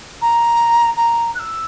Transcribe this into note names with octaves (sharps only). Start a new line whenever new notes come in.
A#5
A#5
F#6
E6